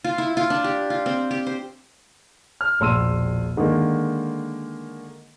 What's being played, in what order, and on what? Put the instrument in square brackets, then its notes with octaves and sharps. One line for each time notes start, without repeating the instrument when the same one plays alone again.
[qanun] F4
E4
F4
D4
G4
F4
C4
G4
C5
[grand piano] F6
E1 A#1 C6 E6 D#7
D3 D#3 G#3 A#3